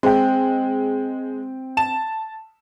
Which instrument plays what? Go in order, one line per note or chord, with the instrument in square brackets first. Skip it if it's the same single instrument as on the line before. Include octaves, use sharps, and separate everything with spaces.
[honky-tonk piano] G#3 [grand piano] C4 G5
[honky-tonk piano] A5 E7